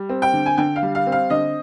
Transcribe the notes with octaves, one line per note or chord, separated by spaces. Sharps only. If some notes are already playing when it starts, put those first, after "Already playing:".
Already playing: G3
C4
G5
D3
G#5
D3 G5
F5
G3
F5
C4
F5
D3 D#5